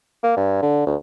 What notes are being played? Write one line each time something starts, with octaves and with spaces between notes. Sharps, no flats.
A#3
G2
D3
D2